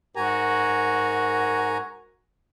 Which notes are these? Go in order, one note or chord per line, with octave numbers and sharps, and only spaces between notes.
G#2 F#4 A#4 G#5 A#5